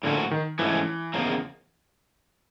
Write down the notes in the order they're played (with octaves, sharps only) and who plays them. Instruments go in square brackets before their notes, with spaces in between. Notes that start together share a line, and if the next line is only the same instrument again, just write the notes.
[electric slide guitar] A2 F3 A#3 C#4 F#4 [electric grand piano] D3
[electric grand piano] D#3
[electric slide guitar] G#2 F3 A3 C#4 [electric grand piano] E3
[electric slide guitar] E2 C#3 F3 A#3